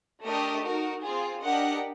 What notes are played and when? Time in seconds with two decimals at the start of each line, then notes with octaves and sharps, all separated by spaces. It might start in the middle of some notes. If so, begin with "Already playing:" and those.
0.25 A3 D4 G4 A#4 D#5
0.63 D#4 F#4 A#4
1.03 C4 F4 G#4
1.43 D4 G4 A#4 D#5 F#5